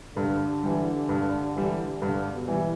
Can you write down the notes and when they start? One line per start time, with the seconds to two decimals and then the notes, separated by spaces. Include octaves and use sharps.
0.16 G2 D3
0.63 E3 G3
1.09 G2
1.56 E3 G3
2.02 G2 D3
2.33 B2
2.48 E3 G3